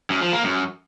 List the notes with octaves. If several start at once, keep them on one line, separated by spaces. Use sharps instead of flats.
F#2
F3
A#3
F#2